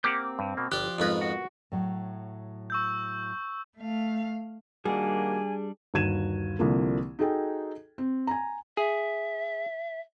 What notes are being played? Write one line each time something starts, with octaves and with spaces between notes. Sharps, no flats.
A#3 C4 G4 F#5 D6 G6
G2
B2 A#3
G1 F3 G4 D5 F#6
F2 G#2 B3 G4 A#4 B4
F#4
A2 F#3
C#6 E6 G6
A3 F5
D#3 G3 A#3 D4 F#4 G#4 G#5
G1 D#2 F#4 G#6 D#7 E7
C2 D3 F3 A#3
D#4 F#4 G#4 A4 G5
C4
G#5 A#5
G#4 E5